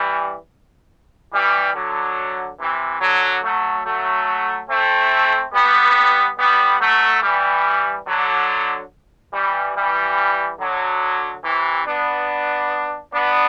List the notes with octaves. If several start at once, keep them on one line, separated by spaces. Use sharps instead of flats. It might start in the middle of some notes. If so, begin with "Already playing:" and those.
Already playing: E3 G3
E3 G3
D3 F#3
C3 E3
D3 F#3
F#3 A3
F#3 A3
A3 C4
G3 B3
G3 B3
F#3 A3
E3 G3
D3 F#3
E3 G3
E3 G3
D3 F#3
C3 E3
B3 D4
B3 D4